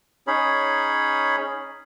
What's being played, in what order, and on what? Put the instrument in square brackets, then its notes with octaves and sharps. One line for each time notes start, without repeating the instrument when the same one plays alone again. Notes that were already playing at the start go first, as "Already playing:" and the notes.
[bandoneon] C#4 D#4 G#4 C#5 B5